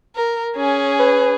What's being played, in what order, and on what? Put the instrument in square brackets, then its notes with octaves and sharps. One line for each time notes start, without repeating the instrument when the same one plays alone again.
[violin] A#4
C#4 G#4
[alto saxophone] B4